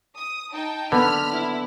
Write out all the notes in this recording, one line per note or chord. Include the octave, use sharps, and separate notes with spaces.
D#6
D#4 G5 A5
D3 B3 B5 F6
E4